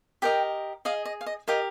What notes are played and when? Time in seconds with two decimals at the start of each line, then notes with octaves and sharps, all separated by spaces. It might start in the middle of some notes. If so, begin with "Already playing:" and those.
0.22 G4 A#4 D#5 G5
0.85 G#4 D#5 F5
1.05 D#5
1.21 F5
1.26 D#5
1.48 G4 A#4 D#5 F5